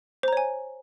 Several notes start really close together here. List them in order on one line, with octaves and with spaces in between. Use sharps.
C5 A#5 C#5 G#5